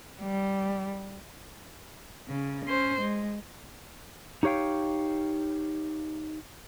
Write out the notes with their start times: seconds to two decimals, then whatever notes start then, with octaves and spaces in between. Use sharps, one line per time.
0.22 G3
2.28 C#3
2.65 C#4 C5
3.00 G#3
4.43 D#4 G4 C#5 F5 G5